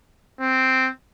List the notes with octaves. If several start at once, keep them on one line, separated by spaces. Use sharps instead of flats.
C4